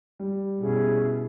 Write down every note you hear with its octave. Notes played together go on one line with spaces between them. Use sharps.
G3
B2 C#4 E4 G#4